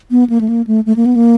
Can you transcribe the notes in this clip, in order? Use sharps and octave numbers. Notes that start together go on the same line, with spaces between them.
B3
A#3
A3
A#3
A3
A3
A#3
B3
A#3